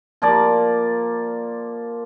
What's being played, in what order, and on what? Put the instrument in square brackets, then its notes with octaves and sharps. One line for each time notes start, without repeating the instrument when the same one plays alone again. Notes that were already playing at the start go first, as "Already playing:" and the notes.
[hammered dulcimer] F3 A#3 D5